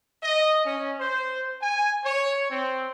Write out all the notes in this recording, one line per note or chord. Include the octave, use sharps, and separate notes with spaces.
D#5
C#4
C5
G#5
C#5
C4